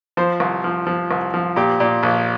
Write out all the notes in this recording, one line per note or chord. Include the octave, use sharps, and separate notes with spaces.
F3 C5
C2
F3
F3
C2
F3
A#2 G4
A#2
A#1